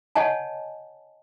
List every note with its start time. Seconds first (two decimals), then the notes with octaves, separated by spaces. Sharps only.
0.15 C#5 D#5 F#5 G#5 A5